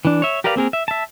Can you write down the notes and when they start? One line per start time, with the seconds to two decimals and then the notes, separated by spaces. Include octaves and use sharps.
0.05 E3 D4
0.22 C#5 E5
0.44 G4 A#4 B4 D5 F5
0.56 A#3 C4 G#4 A#4
0.73 E5
0.88 E5 A5